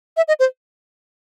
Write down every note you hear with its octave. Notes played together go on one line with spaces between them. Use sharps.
E5
D#5
C5